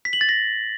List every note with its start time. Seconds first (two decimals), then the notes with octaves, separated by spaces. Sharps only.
0.05 B6
0.13 F#7
0.21 A6
0.29 A#6